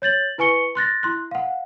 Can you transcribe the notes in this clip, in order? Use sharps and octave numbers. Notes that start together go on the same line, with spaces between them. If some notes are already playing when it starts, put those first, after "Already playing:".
C#5 G6 A6 F#7
E4 B4 G#5 C#6 C#7 G7
C6 F#6 A6 A#6
E4 C6 F#6
F5 F#5